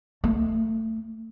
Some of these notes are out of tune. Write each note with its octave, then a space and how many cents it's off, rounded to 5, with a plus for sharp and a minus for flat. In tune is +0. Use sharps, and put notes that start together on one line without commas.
A3 +25